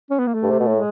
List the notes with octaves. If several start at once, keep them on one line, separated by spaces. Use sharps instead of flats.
C#4
B3
A#3
A3
G2
C3
B2
A2
G#3